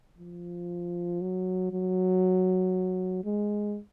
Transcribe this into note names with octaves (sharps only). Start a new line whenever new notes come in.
F3
F#3
F#3
G#3